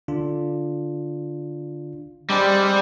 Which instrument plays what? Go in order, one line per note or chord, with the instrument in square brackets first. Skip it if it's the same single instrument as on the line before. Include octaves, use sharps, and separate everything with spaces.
[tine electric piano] D3 D4 F4
[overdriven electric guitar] G3 [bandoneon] G#3 C4 D4